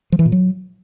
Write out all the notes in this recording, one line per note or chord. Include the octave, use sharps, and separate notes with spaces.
F3
E3
A#2
F#3